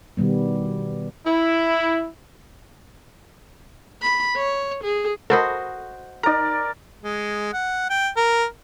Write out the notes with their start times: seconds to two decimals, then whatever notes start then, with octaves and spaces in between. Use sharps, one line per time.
0.17 B2 D#3 G3 B3
1.26 E4
4.02 B5
4.36 C#5
4.84 G#4
5.30 F#4 A4 A#4 C5 D#5 B5
6.23 D#4 A#4 D5 A#5
7.03 G#3
7.53 F#5
7.90 G5
8.17 A#4